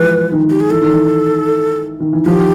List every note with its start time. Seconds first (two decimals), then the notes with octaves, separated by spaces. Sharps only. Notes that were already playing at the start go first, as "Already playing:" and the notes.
Already playing: E3 F3 G#3 B4
0.32 D#3
0.50 G4
0.60 G#4
0.70 E3 A4
0.82 D#3
0.91 E3
2.00 D#3
2.13 E3
2.26 D#3 F3 G4